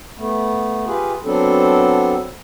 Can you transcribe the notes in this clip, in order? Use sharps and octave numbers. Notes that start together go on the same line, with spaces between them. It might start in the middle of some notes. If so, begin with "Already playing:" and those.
A3 B3
F4 G4 G#4 B4
F#3 B3 C4 D4 A4